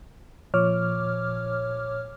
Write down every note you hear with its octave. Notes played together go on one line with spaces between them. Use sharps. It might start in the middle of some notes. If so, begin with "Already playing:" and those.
A#2 F3 C#5 D6 F6